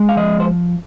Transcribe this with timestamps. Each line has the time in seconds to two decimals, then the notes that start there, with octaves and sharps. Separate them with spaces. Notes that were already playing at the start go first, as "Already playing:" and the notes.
Already playing: G#3
0.09 F5
0.17 F3 D#5
0.40 C5